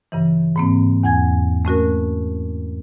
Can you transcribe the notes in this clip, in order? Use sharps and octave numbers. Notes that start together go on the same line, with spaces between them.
G2 C#3 E3
G#2 A#3 C4
E2 F#5 G#5 G#6
A3 C#4 F#4 A#4